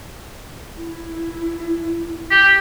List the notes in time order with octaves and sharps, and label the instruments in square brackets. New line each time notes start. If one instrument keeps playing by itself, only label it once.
[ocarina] E4
[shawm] G4